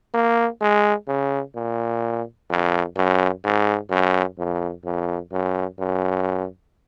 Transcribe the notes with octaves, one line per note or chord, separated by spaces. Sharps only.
A#3
G#3
C#3
A#2
F2
F#2
G#2
F#2
F2
F2
F#2
F#2